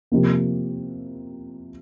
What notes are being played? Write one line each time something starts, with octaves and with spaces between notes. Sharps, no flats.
C3 F3 A#3